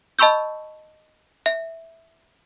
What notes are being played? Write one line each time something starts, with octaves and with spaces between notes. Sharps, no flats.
D#5 A5 B5 C#6 E6 G6
E5